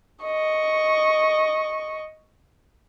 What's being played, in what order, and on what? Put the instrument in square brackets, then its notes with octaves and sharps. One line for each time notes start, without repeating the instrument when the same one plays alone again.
[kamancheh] D#5 C#6